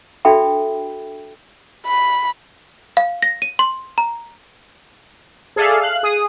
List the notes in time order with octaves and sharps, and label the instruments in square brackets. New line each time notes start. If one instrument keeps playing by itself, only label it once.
[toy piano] D4 F#4 A4 E5 G5 B5
[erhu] B5
[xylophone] F5
A#6
D#7
C6
A#5
[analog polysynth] G#4 A4 D5 E5 F5
F5 F#6
G#4 D#6